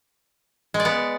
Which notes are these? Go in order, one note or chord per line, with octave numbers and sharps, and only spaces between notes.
G#3
D5
B3